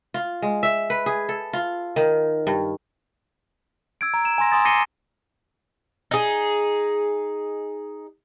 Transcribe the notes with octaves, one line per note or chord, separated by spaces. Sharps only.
F4
G#3
E5
B4
G#4
A4
F4
D#3
G2
E6 G#6 D7
A#5
E7
G#5 A#5 C6 A#6
G#5 C6 D#6 A6
D6 A#6 C7 C#7 D#7 G7
D#4 G#4